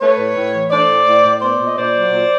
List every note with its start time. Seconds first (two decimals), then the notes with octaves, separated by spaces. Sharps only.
0.01 A3 B4 C#5
0.18 A2
0.36 A2
0.53 E3
0.70 A3 C5 D5
0.88 A2
1.06 A2
1.24 A2
1.41 B3 C5 D5
1.59 A#2
1.65 D#5
1.76 A#2 C5 D5
1.95 F#3
2.12 A#2